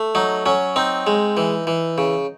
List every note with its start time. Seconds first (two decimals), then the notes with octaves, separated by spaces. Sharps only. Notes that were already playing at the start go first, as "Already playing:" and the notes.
Already playing: A3
0.15 F#3 D#4
0.46 F#3 C#4
0.76 C4 D#4
1.07 G#3
1.37 E3
1.67 E3
1.98 C#3